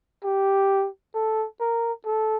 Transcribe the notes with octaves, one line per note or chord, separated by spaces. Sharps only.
G4
A4
A#4
A4